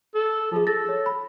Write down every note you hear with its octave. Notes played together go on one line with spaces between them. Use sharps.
A4
F3 F4 G#4
A4 A6 A#6
C#5
B5